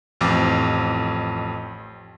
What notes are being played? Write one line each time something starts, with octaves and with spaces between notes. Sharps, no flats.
A1 F2 D6